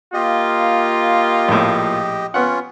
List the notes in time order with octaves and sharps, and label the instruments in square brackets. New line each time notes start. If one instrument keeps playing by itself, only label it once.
[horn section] A#3 F4 [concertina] G4 D#5
[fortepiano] A#1 A2
[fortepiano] B3 F#5 [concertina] C#4 F4